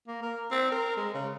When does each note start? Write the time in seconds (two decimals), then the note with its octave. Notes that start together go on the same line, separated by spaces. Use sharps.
0.07 A#3
0.22 A#4
0.51 C4
0.72 A#4
0.97 G#3
1.14 C#3